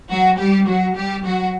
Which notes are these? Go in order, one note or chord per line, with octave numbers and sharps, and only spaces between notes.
F#3 F#4
G3 G4
F#3 F#4
G3 G4
F#3 F#4